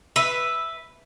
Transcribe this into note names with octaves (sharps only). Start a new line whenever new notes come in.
B4 E5